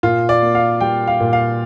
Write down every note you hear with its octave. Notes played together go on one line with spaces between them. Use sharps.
A#2 F4
D5
A#3
F5
G3 G5
F5
A#2
F5